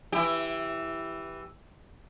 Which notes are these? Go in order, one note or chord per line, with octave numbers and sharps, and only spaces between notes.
E3 E4 G4